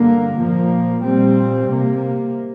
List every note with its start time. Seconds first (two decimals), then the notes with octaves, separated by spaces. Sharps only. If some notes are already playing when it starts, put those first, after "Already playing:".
Already playing: G2 D3 A#3
0.37 A#2 F3 A#3
1.03 A#2 G3 C4
1.68 C3 A#3